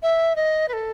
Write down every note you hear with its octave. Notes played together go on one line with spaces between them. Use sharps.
E5
D#5
B4
A4